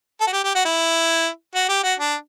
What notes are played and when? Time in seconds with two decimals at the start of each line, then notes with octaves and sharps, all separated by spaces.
0.21 A4
0.27 F#4
0.33 G4
0.44 G4
0.55 F#4
0.65 E4
1.55 F#4
1.69 G4
1.84 F#4
2.00 D4